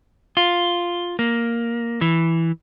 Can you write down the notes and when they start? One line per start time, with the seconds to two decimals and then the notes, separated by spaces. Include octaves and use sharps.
0.37 F4
1.19 A#3
2.01 E3